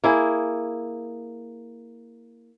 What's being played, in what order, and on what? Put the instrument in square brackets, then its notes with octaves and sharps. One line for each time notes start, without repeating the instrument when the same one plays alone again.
[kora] A#3 E4 G#4